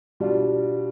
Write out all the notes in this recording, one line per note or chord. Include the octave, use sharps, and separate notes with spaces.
B2 G3 D4 F4